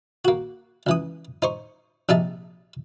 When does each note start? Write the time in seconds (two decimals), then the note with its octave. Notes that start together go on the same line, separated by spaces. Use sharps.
0.25 A#3 F#4
0.87 C#2 E3 D#6
1.42 D#4 C5 C#6
2.09 A#1 C3 D#4 G#4 E5 A5